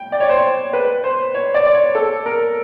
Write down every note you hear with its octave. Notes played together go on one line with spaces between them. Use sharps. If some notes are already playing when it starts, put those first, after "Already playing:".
Already playing: G5
D5
C#5
C5
C#5
B4
C5
C#5
D5
C#5
A4
A#4